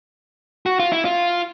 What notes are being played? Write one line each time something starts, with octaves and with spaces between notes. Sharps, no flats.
F#4
F4
E4
F4